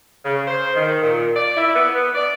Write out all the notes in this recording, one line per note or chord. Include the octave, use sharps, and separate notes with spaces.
C#3
C5
D#3
A#2
D5
E4
B3
B3
D5